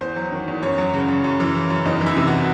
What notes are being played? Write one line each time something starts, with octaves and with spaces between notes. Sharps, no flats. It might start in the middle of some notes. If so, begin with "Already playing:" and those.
E2 C5
F#3
D#3
E2
F#2 C#5
F#3
C#3
F#2
F#2
E3
C#3
F#2
E2 D#4
E3
E4
C3
F#4